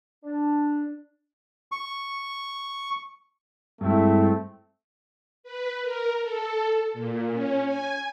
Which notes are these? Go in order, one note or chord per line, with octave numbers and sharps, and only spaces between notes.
D4
C#6
G2 G#3 A3 C4 E4
B4
A#4
A4
A#2
C#4
G#5